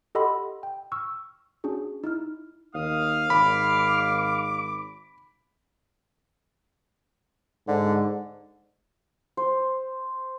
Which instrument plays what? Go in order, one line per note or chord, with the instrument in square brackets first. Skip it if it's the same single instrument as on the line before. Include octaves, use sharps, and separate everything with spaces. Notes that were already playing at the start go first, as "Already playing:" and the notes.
[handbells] G4 A4 D#5 F#5 B5 C6
G5
C#6 E6 F6
C#4 D4 F#4 G#4
D#4 E4 F6
[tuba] D#2 [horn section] F5 [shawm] D#6
[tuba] G#1 [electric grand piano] B5 [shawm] D6
[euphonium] G#2 [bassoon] D3
[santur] C5